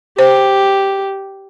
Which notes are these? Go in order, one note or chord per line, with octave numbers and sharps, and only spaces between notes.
G4 C5